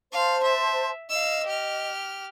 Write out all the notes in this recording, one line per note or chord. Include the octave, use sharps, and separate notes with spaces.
C5 F5 A5
E5
D#5 F5 E6
G4 F6